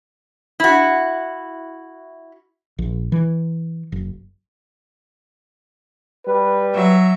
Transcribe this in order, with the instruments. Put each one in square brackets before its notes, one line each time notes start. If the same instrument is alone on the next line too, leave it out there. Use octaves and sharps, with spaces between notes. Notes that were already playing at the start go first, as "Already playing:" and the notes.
[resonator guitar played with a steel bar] E4 F#4
[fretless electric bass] A#1
E3
F#1
[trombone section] G3 B4
[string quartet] F#3 E5